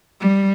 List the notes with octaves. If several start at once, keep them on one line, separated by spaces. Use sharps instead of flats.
G3